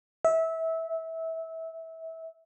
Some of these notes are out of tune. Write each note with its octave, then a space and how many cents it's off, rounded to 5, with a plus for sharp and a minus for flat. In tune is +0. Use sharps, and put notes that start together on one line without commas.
E5 -20